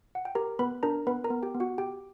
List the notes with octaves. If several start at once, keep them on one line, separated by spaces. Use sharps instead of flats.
F#5
G5
G4 A#4 A#5
B3 B4 B5
D4 A#4 A#5
B3 B4 B5
A#4 A#5
B3
G4 G5
B3
F#4 F#5
G4 G5